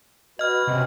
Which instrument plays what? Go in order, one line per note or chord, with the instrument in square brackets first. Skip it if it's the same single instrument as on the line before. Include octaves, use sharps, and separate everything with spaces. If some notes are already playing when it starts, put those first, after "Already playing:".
[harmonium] F#4 B4 [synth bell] D#5 F6
[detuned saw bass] C3 [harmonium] C#4 D#5